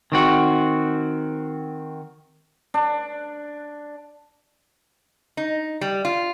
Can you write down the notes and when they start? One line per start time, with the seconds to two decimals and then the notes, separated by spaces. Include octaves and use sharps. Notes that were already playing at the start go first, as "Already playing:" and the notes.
0.12 D#3 C4 F#4
2.74 D4
5.37 D#4
5.81 G3
6.05 F4